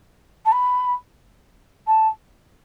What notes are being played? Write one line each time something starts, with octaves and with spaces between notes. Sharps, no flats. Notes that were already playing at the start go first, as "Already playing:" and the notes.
A5
B5
A5